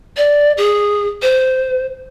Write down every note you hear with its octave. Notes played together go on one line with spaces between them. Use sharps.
D5
G#4
C5